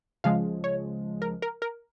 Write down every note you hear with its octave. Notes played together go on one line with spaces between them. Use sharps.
C#2 C#3 F3 G#3 F5
C#5
A#4
A#4
A#4